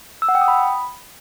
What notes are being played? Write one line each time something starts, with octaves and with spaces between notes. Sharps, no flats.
E6
F#5
G5
D#6
B5